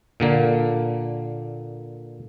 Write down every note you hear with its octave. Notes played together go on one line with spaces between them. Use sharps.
A#2 D3 A#3